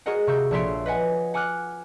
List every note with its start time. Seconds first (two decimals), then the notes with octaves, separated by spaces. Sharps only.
0.06 F#4 G#4 A#4 D#5 F#5
0.27 C3 C#6 E6 G6
0.51 A#1 A4 C#5 E5 C6 D7
0.86 B4 D#5 F#5 G#5
1.34 F#5 G#5 D6 F6 F#6